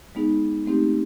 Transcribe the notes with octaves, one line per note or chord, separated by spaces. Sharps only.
G#3 B3 D#4 G#4
A3 C4 D#4 G4